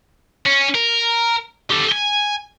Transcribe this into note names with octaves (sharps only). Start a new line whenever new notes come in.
C#4
A#4
G4 A4
G#5